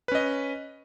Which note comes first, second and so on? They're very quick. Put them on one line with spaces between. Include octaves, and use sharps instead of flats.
B4 C#4 D#5